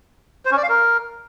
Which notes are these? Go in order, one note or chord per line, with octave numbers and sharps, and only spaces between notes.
C5
C#4
D5
F5
A#4